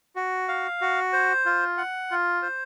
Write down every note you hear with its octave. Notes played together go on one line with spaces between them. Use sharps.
F#4
F5
F#4
C5
F4
F#5
F4
C5